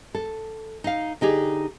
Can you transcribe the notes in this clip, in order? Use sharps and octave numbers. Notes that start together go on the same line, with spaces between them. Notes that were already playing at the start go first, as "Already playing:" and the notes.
A4
D#4 F5
D3 D#4 G4 G#4